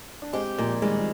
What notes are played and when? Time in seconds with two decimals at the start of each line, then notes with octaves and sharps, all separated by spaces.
0.22 D4
0.33 G#3 C4 G4
0.58 A#2 F3 G#3
0.82 D#3 G3 G#3